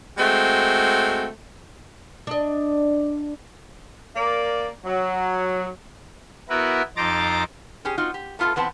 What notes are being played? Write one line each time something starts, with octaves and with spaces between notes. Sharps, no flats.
G#3 A3 C4 F#4
D4 D#5
A#3 A#4 D5
F#3
B3 E4 F#4 A#4 B4
F2 D#4 C5 A#5 D6 A6
C#4 G4 G#4
C4 D#4 F4 F#4
G4
A3 B3 F4 G#4 A4
E2 B3 C4 F#5 A5